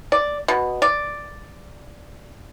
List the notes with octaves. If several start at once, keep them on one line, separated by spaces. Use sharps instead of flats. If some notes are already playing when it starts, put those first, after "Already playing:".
D5
B2
D5